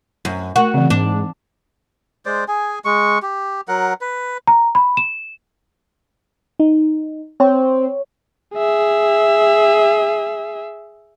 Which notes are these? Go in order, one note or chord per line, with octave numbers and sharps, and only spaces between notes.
F#2
A3 F#4 A#4
C#3 E3 C4
G#2 D4
G#3 C5 D5
G#4 G#5
G#3 C#6
G4
F#3 A#4 F#5
B4
A#5
B5
E7
D#4
C4 C#5
G#4 E5